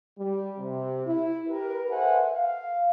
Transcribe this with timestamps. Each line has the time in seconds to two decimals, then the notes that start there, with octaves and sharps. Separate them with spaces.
0.19 G3
0.59 C3
1.07 E4
1.48 G4 A#4 B4
1.90 A4 B4 C5 E5 F#5 G#5
2.33 F5